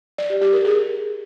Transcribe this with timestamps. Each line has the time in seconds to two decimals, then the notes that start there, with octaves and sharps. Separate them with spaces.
0.18 D5
0.30 G4
0.42 G4
0.53 A#4
0.65 G#4